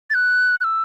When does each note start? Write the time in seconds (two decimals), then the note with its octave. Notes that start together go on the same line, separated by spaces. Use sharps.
0.10 A6
0.14 F#6
0.61 F#6
0.64 E6